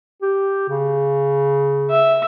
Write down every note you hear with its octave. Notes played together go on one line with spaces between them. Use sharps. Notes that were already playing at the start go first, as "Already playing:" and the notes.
G4
C#3
E5